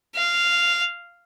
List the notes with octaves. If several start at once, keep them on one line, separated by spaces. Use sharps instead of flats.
F5